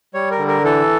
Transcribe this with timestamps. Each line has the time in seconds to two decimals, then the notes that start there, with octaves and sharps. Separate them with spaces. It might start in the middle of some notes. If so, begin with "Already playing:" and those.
0.14 G3 C#5
0.31 A#4
0.38 D3
0.48 A#4
0.64 E3 A4